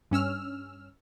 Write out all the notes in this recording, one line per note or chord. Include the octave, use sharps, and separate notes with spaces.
G2 C#4 E6 F6